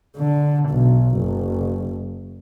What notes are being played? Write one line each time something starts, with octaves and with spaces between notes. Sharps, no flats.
D3
B1
F#1